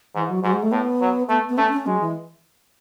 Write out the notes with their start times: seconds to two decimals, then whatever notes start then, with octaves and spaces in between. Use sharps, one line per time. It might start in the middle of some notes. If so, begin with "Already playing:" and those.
0.15 G#2 E3
0.30 F#3
0.43 G#2 F#3
0.53 G#3
0.63 A3
0.72 A2 B3
1.01 F#3
1.29 A3 B3
1.49 B3
1.58 A3 C#4
1.73 C#4
1.86 F#3 G#3
2.01 E3